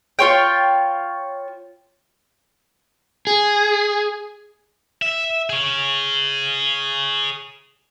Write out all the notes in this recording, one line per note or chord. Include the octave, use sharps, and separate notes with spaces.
F4 C#5 G5
G#4
E5
G#4 C#5